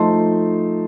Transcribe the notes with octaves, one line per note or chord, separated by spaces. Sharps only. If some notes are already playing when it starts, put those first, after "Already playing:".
Already playing: F3 A3 D#4 A5 C6